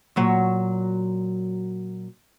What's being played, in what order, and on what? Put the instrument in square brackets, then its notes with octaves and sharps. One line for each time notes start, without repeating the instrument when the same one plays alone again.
[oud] A#2 F#3 C#5